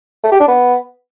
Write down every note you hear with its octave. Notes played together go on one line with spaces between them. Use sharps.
A3
G4
D4
B3